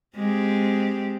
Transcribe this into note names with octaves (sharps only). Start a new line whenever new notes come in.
G#3 C4 G4